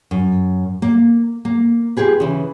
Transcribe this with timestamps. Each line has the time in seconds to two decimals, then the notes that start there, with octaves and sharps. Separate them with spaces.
0.11 F#2
0.82 A#3
1.45 A#3
1.97 F4 G4 G#4 B4
2.20 C#3 E3